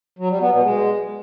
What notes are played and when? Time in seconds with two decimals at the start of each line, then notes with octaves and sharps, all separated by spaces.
0.19 F#3
0.30 G3
0.41 B3
0.52 B2
0.63 G#3